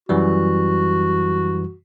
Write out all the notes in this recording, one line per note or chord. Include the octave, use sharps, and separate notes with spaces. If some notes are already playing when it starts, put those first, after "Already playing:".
F#2 E3 G3 F#4